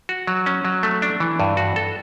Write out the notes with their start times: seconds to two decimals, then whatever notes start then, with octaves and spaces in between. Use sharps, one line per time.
0.09 F#4
0.27 F#3
0.46 C#4
0.65 F#3
0.83 A3
1.02 D4
1.20 E3
1.40 G2
1.57 F#4
1.76 A4